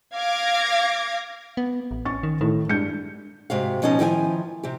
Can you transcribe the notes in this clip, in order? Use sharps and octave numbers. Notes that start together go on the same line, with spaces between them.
F5 D6 G#6 A#6 D7
B3
A1
C#4 C#6 A6
D#3
A2 D#3
G2 G#3 G6 C#7
G#2 C3 F#4 F5
B2 F3 C#4 D#4 D#5
D#3 F3 E4 F5 G#5
C3 G4